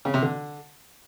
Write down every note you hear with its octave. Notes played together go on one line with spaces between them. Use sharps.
C#3
C3
D3